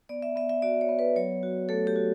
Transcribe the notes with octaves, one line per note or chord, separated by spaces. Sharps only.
B3 D5
E5
B3 E5
E5
F#4 D5
C#5
B3
B4
F#3 C#5
F#4
A3 A4
G4
F#4